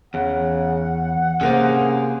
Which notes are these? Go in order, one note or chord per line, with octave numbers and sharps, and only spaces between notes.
E2 C#3 F#5
C3 A#3 C#4 G#4 A#4 C5 D5